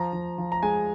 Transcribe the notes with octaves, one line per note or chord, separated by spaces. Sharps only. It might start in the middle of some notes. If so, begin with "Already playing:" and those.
Already playing: F3 A#5
F3
F3
A#5
G#3 G#5